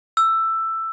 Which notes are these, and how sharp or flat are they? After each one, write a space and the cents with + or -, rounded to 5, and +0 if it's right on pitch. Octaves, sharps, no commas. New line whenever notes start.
E6 +10